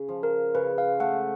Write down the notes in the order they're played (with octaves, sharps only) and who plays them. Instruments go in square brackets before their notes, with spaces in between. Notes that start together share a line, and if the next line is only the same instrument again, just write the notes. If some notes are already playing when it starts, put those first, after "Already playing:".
Already playing: [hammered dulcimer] C#3
F3
[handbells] A#4
[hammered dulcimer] C#3 [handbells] B4
[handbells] F5
[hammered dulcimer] A3 [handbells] F#5